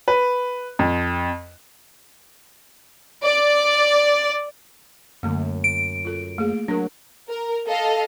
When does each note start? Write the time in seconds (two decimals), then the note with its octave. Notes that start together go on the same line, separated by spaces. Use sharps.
0.08 B4
0.79 F2
3.23 D5
5.23 F#2 D3 A3 A#3
5.64 D7
6.05 F4 A4
6.38 A3 A#3 G#4
6.68 F#3 D4 A#4
7.29 A#4
7.67 A4 D#5 F5